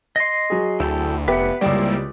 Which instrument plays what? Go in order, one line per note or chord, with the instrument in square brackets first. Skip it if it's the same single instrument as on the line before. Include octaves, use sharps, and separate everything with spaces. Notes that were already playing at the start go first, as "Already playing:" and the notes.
[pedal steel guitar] D#5 C6
[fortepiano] F#3 G#4
[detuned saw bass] D2 [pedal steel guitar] E4 G4 A4
[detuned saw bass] F1 [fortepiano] B3 G4 E5 [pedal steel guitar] B4 F#5
[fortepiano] C#2 G4 D5 [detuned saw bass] G3 [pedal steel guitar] A#3 C4 E4